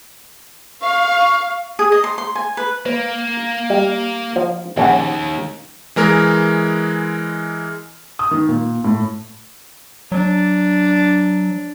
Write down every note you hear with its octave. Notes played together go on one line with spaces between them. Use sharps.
F5 C#6
G#4
D#5
C6
C6
G#5
B4
A#3 B4
G3
F3
A#1 D#2 C#4 F#5
E3 G#3 A#4
D#6
D#3
A#2
A2
F#3 D4